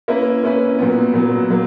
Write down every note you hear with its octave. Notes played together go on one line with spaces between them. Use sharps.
A#3 C#4 E4 B4
A#3 C#4 E4 B4
A#2 F#3 B3
A#2 F#3 B3
F#3 A#3